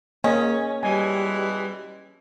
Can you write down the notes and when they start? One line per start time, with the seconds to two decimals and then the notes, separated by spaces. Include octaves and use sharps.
0.24 A#3 C#4 G#4 D#5
0.83 B2 E3 G3 G#3 G#5